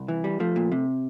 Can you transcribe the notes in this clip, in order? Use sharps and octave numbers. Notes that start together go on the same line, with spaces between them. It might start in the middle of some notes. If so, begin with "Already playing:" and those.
Already playing: C2
E3
G3
F3 A3
A#2
C3